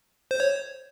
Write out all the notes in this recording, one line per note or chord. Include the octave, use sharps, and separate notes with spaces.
C5
C#5